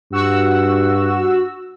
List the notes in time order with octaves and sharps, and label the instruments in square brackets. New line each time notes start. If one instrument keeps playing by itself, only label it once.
[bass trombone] G2 [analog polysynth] F#4 E6